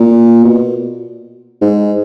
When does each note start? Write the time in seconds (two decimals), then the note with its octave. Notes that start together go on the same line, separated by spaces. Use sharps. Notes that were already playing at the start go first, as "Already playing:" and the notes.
Already playing: A#2
0.44 B2
1.62 G#2